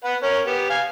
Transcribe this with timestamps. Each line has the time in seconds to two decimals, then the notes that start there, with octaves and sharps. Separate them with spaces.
0.04 B4 F#5
0.23 C#4 A#4
0.46 B3 G4
0.70 F5 G#5